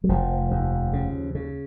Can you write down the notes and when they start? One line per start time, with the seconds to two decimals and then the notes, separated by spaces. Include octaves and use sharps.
0.04 F#3
0.09 F1 F3
0.51 D#2
0.93 C#3
1.35 C#3